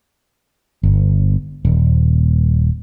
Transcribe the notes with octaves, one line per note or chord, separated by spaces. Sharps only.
G1
D#1